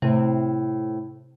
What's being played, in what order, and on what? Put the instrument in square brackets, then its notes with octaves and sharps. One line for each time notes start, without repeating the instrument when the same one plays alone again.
[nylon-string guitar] A2 C4 [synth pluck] C3